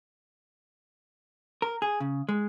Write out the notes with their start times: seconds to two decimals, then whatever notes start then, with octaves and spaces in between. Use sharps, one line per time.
1.62 A#4
1.82 G#4
2.00 C#3
2.29 G#3